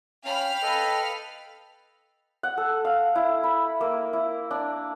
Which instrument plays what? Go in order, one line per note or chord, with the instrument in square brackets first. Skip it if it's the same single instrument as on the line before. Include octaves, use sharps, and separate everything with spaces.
[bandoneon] C#4 [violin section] F5 B5 F6 [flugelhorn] G5
[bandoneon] A4 B4 D#5
[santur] F#5
A4
F5
E4
B5
A#3
E4
D4